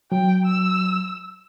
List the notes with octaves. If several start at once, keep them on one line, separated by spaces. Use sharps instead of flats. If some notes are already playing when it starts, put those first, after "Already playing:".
F#3 G5
E6